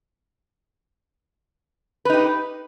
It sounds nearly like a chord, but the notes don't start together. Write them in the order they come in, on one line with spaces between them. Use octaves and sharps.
B4 D#4 G4